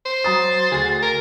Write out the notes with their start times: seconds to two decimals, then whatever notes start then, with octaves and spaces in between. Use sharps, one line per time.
0.06 C5
0.24 F#3 A#5 D#6 A6
0.72 D2 F#4 G#4 C7
1.03 A#4